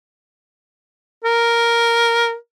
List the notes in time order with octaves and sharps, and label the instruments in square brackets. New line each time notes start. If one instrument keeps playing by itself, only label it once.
[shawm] A#4